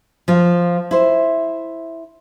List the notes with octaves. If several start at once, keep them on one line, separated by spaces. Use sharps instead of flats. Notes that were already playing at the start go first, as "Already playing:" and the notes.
F3 F4
E4 C5